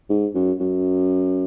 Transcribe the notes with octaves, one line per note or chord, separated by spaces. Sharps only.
G#2
F#2
F#2